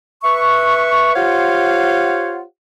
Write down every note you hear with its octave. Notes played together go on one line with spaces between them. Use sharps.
B4 E5 C#6
F4 G4 C5 C#5 F5 F#5